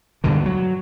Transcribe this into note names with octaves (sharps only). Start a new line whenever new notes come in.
D2 G2 B2 D3
F#3